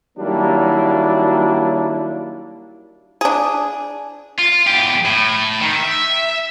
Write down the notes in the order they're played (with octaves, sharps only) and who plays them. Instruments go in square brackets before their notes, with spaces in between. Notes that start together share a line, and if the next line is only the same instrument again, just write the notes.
[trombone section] D#3 F#3 G3 A#3 D4 E4
[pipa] D4 G#4
[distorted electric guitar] F4
E2 G4
A2
D#3
E5